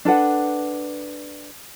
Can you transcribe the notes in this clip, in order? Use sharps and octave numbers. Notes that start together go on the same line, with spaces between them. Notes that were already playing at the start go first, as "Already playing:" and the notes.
D4 A4 B4 F#5